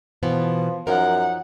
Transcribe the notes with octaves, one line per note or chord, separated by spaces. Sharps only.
B2 E3 F3 B3
F#2 F3 D#4 A#4 F#5